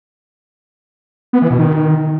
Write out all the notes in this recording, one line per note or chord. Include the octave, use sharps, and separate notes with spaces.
B3
E3
B2
D#3